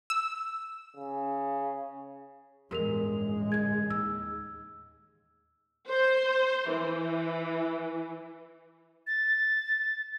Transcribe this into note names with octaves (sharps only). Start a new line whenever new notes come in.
E6
C#3
A1 E2 G2 G#3 G4 A#4 F7
D3 E3 G#6
D#2 E6
C5
E3
A6